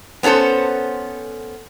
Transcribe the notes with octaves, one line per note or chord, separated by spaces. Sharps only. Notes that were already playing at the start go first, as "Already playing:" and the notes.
B3 C#4 F4 A4 C5